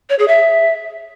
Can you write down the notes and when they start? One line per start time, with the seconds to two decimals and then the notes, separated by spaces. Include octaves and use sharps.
0.10 C#5
0.19 G#4
0.28 E5